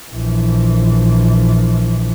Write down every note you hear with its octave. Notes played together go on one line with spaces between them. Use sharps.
A#1 E3